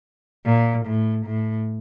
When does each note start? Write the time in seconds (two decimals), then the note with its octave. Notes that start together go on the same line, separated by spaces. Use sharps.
0.46 A#2
0.86 A2
1.26 A2